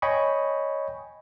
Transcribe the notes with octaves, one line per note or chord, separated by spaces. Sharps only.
C#5 D#5 G5 G#5 B5 C#6